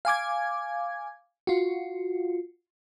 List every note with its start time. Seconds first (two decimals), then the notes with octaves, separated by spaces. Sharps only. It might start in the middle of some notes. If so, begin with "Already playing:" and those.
0.05 F5 G#5 D6 G#6
1.47 F4 F#4